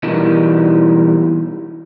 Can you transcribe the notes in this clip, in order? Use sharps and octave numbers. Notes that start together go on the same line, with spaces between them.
B2 E3 G3 D#4 A#4